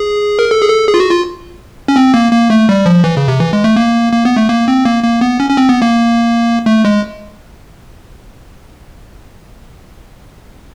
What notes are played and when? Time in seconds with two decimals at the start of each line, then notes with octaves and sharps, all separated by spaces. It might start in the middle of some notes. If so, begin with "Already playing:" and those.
Already playing: G#4
0.39 A#4
0.51 A4
0.61 G#4
0.69 A4
0.87 G#4
0.94 F4
1.00 F#4
1.11 F4
1.88 C#4
1.96 C4
2.14 A#3
2.32 A#3
2.50 A3
2.69 G3
2.86 F3
3.04 E3
3.17 C#3
3.28 C3
3.40 E3
3.53 G#3
3.64 A3
3.76 A#3
4.13 A#3
4.25 B3
4.36 A3
4.49 A#3
4.68 C4
4.86 A#3
5.03 A#3
5.21 B3
5.40 C#4
5.50 C#4
5.57 C4
5.69 B3
5.82 A#3
6.66 A3
6.85 G#3